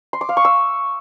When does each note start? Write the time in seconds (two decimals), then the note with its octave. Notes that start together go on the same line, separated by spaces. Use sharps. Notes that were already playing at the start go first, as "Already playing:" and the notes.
0.13 C6
0.21 D6
0.29 F5
0.37 C#6
0.45 E6